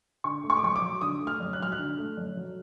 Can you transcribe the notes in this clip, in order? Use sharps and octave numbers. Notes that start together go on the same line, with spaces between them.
D3 C#6
A3
C#6
D6
F#2 C#6
D6
F#3
D3 D#6
A3
F6
F#2
F#6
F#3 F6
F#6
D3
A3
F#2
F#3